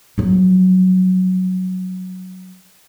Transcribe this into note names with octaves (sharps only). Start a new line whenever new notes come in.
F3 F#3